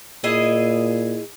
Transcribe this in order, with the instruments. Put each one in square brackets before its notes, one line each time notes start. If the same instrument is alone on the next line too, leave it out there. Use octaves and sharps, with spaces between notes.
[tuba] A#2 [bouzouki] E4 G#4 D#5